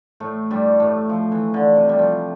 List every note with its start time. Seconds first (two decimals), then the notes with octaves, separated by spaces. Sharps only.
0.20 A2 A3
0.51 G2 G3
0.80 A2 A3
1.09 F3
1.32 E3
1.54 D3
1.76 C3
1.89 G3
1.99 F3